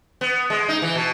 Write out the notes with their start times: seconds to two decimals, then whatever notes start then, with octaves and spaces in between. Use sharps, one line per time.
0.21 B3
0.50 G#3
0.68 D#4
0.82 E3
0.95 B2